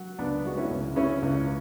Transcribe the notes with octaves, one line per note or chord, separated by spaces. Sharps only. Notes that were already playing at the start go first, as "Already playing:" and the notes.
Already playing: F#3
C#2 B3 D4
G#3 F#4
C#4 E4
C#2
C#3 C#4 E4
C#2